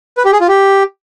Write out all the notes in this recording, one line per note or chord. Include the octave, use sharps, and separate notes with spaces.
B4
G4
G#4
F4
G4